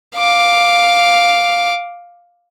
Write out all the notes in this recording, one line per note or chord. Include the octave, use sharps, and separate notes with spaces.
F5 D6